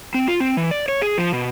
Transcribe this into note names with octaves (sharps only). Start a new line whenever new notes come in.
C4
F4
C4
E3
D5
C#5
G#4
F3
B2